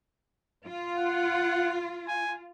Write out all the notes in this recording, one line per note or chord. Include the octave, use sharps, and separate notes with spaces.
F4
F#5
G#5